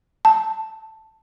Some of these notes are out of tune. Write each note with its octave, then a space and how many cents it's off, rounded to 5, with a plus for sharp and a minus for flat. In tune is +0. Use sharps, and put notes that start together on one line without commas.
A5 +5